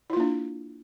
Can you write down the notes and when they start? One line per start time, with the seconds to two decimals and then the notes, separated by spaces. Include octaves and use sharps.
0.10 E4
0.13 F4
0.16 A#3
0.20 D4